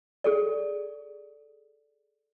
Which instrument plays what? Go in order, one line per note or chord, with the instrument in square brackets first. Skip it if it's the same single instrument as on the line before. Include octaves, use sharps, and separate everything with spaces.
[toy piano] G#4 A4 D5